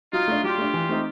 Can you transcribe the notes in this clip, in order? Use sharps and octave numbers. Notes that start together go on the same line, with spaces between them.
F#3 D#4 F4
A3 D4
F#3 F4 G4
A3 D4
E3
A3 C4 D#4